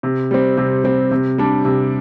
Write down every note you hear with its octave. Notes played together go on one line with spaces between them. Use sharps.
C3
G3 C4
C3
G3 C4
C3
G3 D4
C3